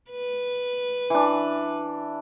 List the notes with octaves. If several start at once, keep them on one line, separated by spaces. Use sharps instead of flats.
B4
E3 D4